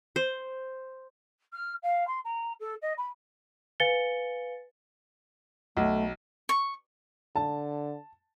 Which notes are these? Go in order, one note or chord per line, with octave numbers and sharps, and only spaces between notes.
C5
F6
F5
C6
A#5
A4
D#5
B5
B4 F5 G#5 A6 C#7 G7
B1 A3
C#6
D3 A5